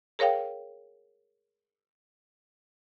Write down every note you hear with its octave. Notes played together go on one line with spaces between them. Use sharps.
G#4 A#4 C#5 F5 G5